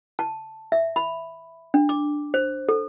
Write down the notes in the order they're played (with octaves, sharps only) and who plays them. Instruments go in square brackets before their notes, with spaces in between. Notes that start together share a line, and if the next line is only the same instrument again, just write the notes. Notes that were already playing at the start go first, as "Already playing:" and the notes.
[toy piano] A5
E5
B5
D4
D6
C5
A4